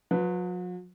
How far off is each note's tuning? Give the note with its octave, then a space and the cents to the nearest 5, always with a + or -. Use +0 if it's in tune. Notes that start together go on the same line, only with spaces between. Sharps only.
F#3 -45 B4 +0